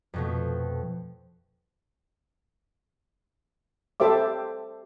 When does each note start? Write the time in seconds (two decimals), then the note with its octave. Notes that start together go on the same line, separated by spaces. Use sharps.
0.14 F2 B2 A3
4.00 G4 A4 C5 E5 D6